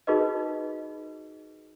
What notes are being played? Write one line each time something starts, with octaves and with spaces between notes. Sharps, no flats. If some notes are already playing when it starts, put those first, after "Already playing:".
D#4 F#4 G#4 A#4 B4 D#5